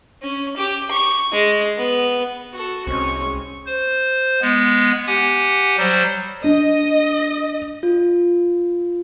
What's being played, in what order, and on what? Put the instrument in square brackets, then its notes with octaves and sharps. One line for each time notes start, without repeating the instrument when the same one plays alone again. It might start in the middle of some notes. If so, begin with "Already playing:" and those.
[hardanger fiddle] C#4
G4
C#6
G#3
B3
[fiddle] F#4 A4
[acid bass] C2 [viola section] G#3 C4 C#4 [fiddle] C#6
[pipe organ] C5
G#3 B3
G4 F#5 G#5
F#3 G3 C5
[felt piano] D4 [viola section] D#5
[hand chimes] F4